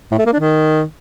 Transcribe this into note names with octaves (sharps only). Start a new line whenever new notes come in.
A2
A3
A#3
D4
D#3